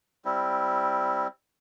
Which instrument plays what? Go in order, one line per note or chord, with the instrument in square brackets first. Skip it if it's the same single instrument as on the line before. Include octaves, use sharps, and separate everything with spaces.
[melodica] G3 C4 E4